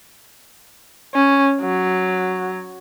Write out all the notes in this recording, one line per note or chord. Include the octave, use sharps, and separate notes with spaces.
C#4
F#3